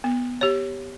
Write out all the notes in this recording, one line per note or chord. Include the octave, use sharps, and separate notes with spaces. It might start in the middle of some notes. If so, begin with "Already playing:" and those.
B3
G4 C#5